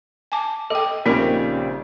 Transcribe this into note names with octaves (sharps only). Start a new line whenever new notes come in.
G#5 A5 D6
A4 D#5 G5 D6
A#1 C#3 G3 C4 D#4 A#4 G5